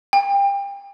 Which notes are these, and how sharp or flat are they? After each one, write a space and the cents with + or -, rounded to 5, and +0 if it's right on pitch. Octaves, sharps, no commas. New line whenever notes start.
G5 +30